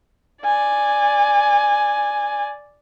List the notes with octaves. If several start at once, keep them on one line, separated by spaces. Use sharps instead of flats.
D5 G#5